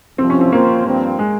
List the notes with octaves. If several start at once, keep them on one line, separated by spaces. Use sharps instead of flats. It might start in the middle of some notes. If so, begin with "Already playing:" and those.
C2 C3 F3 C4
C#4
C4
F3 A#3 C4 F4 C5
G2 F3 C4
G#3